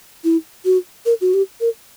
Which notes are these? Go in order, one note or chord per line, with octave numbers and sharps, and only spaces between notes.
E4
F#4
A#4
F#4
G4
A#4